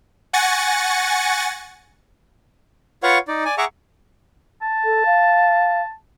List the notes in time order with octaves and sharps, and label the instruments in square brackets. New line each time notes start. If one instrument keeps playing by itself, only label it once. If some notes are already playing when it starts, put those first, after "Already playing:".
[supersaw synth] F#5 G#5 C#6 A6 A#6 C#7
[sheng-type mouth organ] F4 B4 C#5 F5 F#5 C#6
D#4 D5
D5 G#5
G#4 E5 F#5 A#5 C#6 D6
[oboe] A5
[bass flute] A4
F5